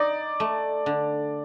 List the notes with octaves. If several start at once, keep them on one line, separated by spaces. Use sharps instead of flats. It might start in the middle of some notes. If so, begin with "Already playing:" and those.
Already playing: D#4 D5
A3
D3